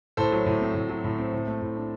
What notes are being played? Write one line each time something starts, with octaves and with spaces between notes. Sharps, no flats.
A2 A4 C5
F#3
A2
C4
A2
F#3
A2
C4
A2
A3
A2
D4